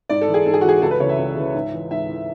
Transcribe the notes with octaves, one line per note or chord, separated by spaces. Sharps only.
G#2 D5
A4
E3
G#4
G#2 A4
G#4
F#4
E3 G#4
C#2 A4
B4
C#3 E3 C#5
E5
C#2
C#3 E3
G#2
E3
G#2 E5
E3